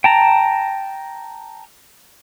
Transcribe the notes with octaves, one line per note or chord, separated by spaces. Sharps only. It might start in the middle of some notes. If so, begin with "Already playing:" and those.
G5 A5 A#5